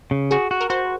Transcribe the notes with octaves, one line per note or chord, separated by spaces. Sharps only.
C#3
F#4 G#4
F#4
A#4
F#4 C5